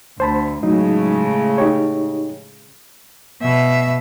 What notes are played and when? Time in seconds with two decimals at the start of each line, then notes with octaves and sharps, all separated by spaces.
0.20 D2 C5 A5 B5
0.63 A2 C#3 F#3 G#3 D#4
1.58 D#4 G4 C#5
3.41 B2 E5